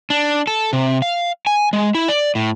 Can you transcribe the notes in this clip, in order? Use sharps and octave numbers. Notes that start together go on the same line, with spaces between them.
D4
A4
C3
F5
G#5
G#3
E4
D5
A2